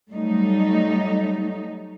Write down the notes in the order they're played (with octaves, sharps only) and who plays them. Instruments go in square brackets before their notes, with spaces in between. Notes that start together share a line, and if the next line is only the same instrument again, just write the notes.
[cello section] F#3 G3 A3 D#4